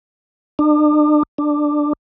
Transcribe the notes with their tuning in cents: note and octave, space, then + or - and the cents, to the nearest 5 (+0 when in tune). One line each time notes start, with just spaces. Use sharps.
D4 +40
D4 +10